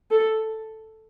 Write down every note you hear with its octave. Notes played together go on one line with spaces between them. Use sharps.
A4